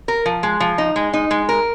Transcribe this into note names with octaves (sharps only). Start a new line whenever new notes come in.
A#4
F3
G#3
F3
D#4
G#3
D#4
G#3
A#4